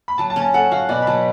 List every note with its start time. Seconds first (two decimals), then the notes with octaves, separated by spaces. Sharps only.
0.08 B5
0.18 F#3 A5
0.30 A5
0.36 C#4
0.42 A5
0.54 A4 F#5
0.72 F#4 F5
0.89 B2 D5
1.02 B5
1.07 F#3 A5